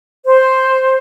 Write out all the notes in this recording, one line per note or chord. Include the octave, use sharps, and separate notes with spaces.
C5